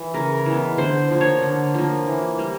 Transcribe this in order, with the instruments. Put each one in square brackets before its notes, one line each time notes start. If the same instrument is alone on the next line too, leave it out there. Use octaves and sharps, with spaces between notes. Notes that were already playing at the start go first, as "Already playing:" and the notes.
Already playing: [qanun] E3
C#3 A#4
E3 G#3 B3
D3 C5
F3 A#3
C#5
D3
F3 A#3
E3
G3 A#3